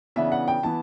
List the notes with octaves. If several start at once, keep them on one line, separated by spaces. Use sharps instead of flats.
C#3 E3 B3 D4 E5
F#5
G5
E3 B3 A5